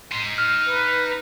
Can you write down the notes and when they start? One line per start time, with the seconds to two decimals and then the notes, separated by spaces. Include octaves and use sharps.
0.12 D#4 C6
0.38 F6
0.65 B4